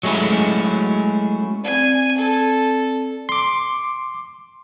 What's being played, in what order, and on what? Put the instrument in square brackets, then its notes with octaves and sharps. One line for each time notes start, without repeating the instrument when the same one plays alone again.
[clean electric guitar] F#3 G#3 A3 C#4 E4
[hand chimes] C4 D5 [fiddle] G#5
[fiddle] A4
[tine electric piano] C6 D6